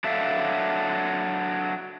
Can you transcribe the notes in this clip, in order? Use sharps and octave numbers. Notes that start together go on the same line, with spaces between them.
F#3 D4 A4 E5 F5